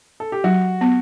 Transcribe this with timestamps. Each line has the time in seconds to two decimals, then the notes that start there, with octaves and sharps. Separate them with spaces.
0.20 A4
0.32 G4
0.44 F#3 F#4
0.81 B3